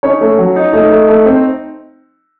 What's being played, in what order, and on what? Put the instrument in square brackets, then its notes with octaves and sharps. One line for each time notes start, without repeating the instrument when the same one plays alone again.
[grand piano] C#4 D#4 C#5
A3
F#3
D#4
A3 D#4 D#5
A3
A3
C4